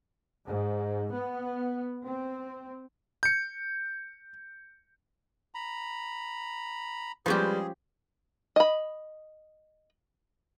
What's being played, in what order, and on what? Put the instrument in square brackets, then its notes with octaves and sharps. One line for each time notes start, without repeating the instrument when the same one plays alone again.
[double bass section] G#2
B3
C4
[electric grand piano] G6 C#7
[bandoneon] A#5 B5
[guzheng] F3 C#4 G4 [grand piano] G3 G#3 B4 [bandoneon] G#4
[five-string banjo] D#5 B5